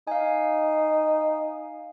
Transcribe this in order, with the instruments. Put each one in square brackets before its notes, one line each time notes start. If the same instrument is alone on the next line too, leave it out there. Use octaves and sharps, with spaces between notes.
[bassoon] D#4 [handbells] F5 G#5